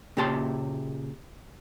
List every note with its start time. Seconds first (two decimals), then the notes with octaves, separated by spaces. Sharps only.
0.17 A#2 C#3 G4 A5 C6